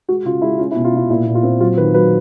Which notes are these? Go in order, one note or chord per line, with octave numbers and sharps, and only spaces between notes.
G#3 F#4
C#3 F4
G#3 E4
C#4 F4
E4
B2
F4
B2 E4
A#2 E4
A#2
F4
C4
F#3 F4
D#3 B4
F#3 B4